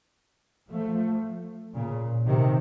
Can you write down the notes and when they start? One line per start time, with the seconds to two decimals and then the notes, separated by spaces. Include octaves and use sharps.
0.70 F3 A3
1.74 A#2 C#3
2.27 C3 D#3